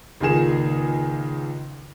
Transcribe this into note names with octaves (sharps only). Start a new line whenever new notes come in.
C#2 A#2 D#3 G#4 E7